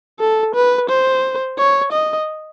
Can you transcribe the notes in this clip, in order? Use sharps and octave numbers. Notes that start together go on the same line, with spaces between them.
A4
B4
C5
C#5
D#5